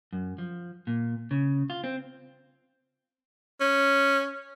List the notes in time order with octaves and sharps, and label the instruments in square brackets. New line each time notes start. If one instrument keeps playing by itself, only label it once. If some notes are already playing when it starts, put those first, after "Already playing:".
[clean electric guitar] F#2
F3
A#2
C#3
F4
C4
[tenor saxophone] C#4